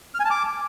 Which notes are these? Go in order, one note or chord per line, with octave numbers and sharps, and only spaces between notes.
F6
G#5
A5
D6